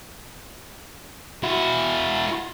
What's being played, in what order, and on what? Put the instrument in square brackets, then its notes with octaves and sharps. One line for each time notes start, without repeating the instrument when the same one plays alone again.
[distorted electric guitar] E4 F#4